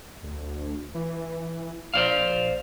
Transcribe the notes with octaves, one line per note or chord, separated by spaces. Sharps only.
D2
E3
A#1 C5 D5 F5